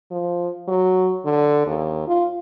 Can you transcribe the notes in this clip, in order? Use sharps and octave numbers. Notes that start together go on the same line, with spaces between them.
F3
F#3
D3
D#2
F4